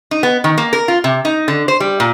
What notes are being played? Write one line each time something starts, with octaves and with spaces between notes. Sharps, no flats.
D#4
B3
D#3
A#3
A#4
F4
C3
D#4
D3
C5
G3
A#2